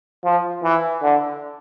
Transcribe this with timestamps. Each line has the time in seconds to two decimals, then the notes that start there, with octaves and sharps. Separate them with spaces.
0.25 F3
0.64 E3
1.03 D3